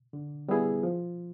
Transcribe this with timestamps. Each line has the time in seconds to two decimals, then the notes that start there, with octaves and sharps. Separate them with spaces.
0.13 D3
0.48 G3 B3 E4 G#4
0.83 F3